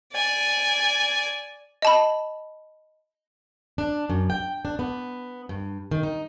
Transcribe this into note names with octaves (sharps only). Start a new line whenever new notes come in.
D5 G#5
D#5 A5 B5
D4
F#2
G5
D4
B3
G2
D#3
D#4